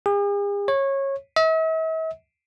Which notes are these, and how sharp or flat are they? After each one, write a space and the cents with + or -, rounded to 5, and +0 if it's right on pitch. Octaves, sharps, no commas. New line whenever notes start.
G#4 -45
C#5 -20
E5 -45